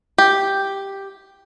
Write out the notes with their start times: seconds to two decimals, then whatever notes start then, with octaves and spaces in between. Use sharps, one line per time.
0.18 G4